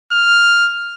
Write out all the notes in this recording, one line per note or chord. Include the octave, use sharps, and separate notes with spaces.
F6